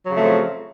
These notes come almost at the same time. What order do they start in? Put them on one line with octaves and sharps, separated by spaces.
F#3 C#3 F2 A3 F3